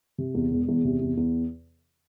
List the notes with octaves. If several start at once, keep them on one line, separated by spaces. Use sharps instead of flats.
C3
E2
E1
E2
C3
E2
E2